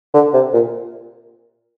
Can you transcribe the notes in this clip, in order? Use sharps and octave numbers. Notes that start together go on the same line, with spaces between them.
D3
C3
A#2